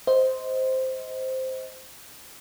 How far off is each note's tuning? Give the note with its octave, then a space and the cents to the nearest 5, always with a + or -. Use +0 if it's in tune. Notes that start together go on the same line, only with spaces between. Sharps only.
C5 -5 D#5 +20